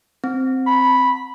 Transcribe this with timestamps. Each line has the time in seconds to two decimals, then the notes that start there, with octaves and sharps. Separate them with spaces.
0.24 C4
0.67 B5